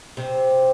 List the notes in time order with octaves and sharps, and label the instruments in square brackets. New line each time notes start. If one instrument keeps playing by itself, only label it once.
[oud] C3